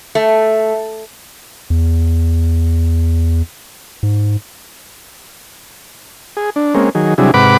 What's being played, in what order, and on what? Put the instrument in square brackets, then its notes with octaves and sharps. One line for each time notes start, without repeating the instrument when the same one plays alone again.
[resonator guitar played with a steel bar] A3
[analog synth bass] E2
G#2
[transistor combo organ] G#4
D4
G#3 A#3 C4 C#4
D#3 F#3 G#4
C3 F#3 G3 D4 E4 G#4
G#2 C3 B4 F#5 B5 D6